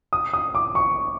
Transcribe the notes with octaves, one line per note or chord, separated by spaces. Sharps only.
D#6
D#6
D6
C#6